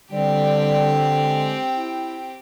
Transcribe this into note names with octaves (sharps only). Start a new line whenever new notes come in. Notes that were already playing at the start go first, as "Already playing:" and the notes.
D3 G3 C4 G4
G#3
E4